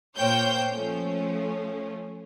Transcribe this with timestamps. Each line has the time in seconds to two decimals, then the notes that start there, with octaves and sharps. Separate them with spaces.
0.16 A#2 A#3 C5 C#5 G5 G6
0.71 F3 A3 C#4